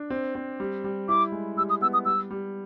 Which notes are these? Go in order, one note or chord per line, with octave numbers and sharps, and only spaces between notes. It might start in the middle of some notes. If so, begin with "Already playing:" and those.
Already playing: D4
C4
C4
G3
G3
E4 D6
G#3
G3 E6
D#6
B3 E6
D#6
G3 E6
G3